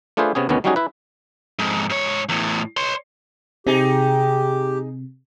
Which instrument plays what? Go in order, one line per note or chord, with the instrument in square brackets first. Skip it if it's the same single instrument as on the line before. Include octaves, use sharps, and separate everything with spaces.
[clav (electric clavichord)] A3 D4 F4 G#4 B4 C5
C3 B3 C#4 G#4
D2 B2 D#3 B3 C#4
F#3 G3 C#4 D#4 F#4 G#4
E4 B4
[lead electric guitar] F2 G#2
G#2 C#5
E2 A2
C#5 C6
[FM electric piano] C3 [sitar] D#4 G#4 [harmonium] G4